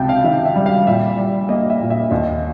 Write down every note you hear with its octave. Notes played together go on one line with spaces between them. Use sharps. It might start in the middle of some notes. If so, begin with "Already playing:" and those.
Already playing: C#2 C3 G5 A5
F5
D#3 E5
E5
G3
F5
A#2 E5
G3
A#3 D#5
E5
A#2
E5
D#2 D#5